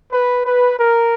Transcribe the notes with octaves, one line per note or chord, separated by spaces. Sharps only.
B4
B4
A#4